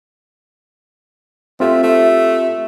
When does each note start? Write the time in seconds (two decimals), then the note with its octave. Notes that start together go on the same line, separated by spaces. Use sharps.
1.60 A3 C4 F4 G4
1.84 A3